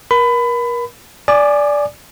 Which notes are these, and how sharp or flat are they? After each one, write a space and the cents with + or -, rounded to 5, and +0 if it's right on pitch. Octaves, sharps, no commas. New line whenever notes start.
A#4 +35 B5 +25
D5 -10 G#5 +0 D6 +45